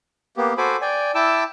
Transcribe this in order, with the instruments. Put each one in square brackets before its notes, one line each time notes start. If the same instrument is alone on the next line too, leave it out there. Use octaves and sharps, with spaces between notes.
[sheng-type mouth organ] A#3 B3 G4
F#4 A4 C5 G#5 B5 D6
D5 G5 G#5
E4 G5 A5 D6 E6